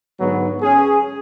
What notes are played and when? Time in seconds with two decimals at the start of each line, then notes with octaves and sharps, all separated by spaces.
0.19 G#2 D3 F#3 B3
0.62 C#4 G#4